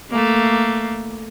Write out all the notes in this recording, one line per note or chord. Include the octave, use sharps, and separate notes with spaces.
A3 A#3